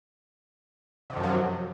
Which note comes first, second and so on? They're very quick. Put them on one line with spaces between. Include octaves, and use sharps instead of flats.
C3 D#3 F#2 F3 F#3